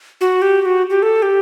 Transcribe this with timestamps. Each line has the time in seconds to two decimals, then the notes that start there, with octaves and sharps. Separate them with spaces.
0.21 F#4
0.42 G4
0.61 G4
0.65 F#4
0.90 G4
1.03 A4
1.22 G4